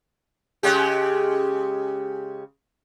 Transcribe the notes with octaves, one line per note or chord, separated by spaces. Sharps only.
C#3 G#3 G4